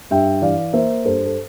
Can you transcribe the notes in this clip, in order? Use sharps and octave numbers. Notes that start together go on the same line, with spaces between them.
G2 E5 G5
E3 D5 F5
A#3 C5 E5
G2 A4 C5
A4